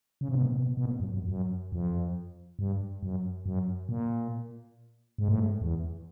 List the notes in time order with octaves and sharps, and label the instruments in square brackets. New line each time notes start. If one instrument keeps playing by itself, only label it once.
[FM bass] C#3
C3
B2
A#2
B2
B2
A#2
F#2
F#2
F#2
F2
G2
F#2
F#2
A#2
G#2
A2
G#2
E2